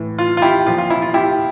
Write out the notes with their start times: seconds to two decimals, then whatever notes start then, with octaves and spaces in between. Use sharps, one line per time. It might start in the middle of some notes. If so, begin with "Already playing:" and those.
Already playing: A2 E3
0.19 F4
0.37 F4
0.42 E4 G4
0.67 A#2 F3 F4
0.78 F4
0.90 E4
1.02 F4
1.14 E4 G4